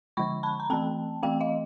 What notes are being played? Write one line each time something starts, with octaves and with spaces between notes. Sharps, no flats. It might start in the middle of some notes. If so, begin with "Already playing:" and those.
D3 F3 G#3 B5 C#6
A5 B5
A#5
E3 A3 C4 G5 A5
E3 A3 C4 F5 G5
D#5 F5